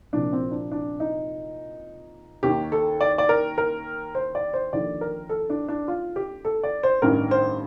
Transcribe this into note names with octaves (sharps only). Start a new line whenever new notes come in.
C2 A#2 F3 D4
C4
D4
D4
D#4
D#2 D#3 G4
A4
D5
D5
A#4
A#4
C5
D5
C5
D#2 D3 F3 D5
A#4
A4
D4
D4
F4
G4
A4
D5
C5
A1 G2 D#3 A#4
C5